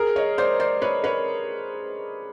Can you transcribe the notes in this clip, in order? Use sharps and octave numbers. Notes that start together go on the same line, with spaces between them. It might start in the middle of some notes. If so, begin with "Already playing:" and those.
Already playing: G#4 A#4
C#5 D#5
C5 D5
C5 D5
B4 C#5
B4 C#5